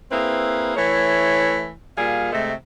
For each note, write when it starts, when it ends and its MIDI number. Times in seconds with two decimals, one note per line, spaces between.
0.12 0.72 58
0.12 0.72 60
0.12 0.72 64
0.12 0.72 68
0.12 0.72 71
0.76 1.70 52
0.76 1.70 57
0.76 1.70 73
1.98 2.29 46
1.98 2.29 55
1.98 2.29 68
1.98 2.29 77
2.33 2.53 48
2.33 2.53 56
2.33 2.53 57